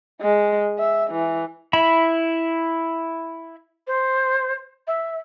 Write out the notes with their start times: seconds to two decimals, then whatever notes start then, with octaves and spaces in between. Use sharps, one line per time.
0.21 G#3
0.79 E5
1.11 E3
1.73 E4 E5 B5
3.87 C5
4.87 E5